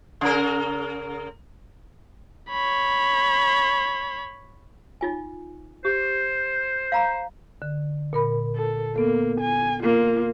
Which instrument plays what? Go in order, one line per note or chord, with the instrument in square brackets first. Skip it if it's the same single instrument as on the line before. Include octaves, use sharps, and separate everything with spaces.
[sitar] C#3 A#4
[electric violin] C#5 B5
[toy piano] D#4 F4 G#5
[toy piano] G4 [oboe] C5
[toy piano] F5 A#5 B5
[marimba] D3
A#2 A#4 B5
[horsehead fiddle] A4
[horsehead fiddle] A#3 [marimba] B3 A4
[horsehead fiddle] G#5
A#3 F4